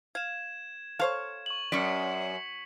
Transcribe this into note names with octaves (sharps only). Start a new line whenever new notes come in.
F5 G#6 E7
A4 C5 C#5 F5
C#6 F#7
F#2 C#4 D5 B6 C#7